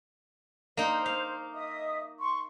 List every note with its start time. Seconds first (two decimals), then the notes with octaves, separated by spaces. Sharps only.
0.77 A#3 D#4 C5
1.06 F5
1.54 D#5 E5 D#6
2.19 C6 C#6